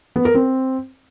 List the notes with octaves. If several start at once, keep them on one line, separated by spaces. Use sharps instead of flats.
B3
A#4
C4